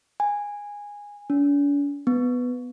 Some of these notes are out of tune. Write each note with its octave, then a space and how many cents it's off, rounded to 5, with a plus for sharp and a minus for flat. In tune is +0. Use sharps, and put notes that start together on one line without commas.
G#5 -15
D4 -45
B3 +5